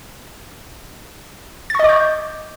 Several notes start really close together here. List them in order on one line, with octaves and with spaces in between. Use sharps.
A6 C#6 D#5 D6 G6